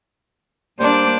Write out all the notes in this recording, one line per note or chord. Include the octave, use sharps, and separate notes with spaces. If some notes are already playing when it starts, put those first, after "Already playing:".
G3 A#3 D4 C5 D5